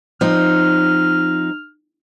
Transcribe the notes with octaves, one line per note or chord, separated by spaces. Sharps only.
F3 C4 D#4 F6